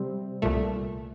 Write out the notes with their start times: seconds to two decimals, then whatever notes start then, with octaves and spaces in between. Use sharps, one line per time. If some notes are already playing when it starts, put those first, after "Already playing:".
Already playing: C3 G3 C4
0.42 C2 A#2 A3